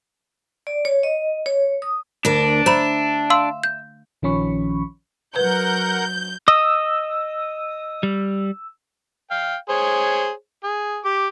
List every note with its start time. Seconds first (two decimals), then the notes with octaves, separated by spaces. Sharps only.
0.67 D5
0.85 C#5
1.03 D#5
1.46 C#5
1.82 D#6
2.25 D2 D4 A#4
2.66 C5 E5 A#5 B5
3.30 F5 C6 E6
3.64 G6
4.22 A#1 D#3 F3 C#4 B5 C#6
5.36 F#3 A#4 B4 F#5 G6
6.48 D#5 D#6 E6
8.03 G3
9.31 F5 G5
9.69 G#4 C5 C#5
10.64 G#4
11.05 G4 D6